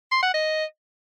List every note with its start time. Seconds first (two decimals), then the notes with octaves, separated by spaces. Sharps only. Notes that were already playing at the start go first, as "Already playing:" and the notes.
0.11 C6
0.23 F#5
0.34 D#5